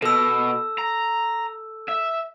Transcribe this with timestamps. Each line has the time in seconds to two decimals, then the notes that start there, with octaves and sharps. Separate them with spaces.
0.02 B2 A4 E6
0.78 A#5
1.89 E5